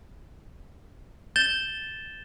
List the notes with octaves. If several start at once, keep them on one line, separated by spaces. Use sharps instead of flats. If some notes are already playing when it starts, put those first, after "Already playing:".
G6 A6 E7 G7